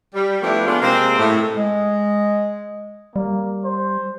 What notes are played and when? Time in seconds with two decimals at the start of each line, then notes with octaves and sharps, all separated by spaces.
0.14 G3
0.42 F3 A3 B3 D4 E4 G4
0.66 G#3 B3 D4 F4
0.82 C3 G#3 A#3 C4
1.19 A2
1.57 G#3
3.16 G3 A#3
3.65 C5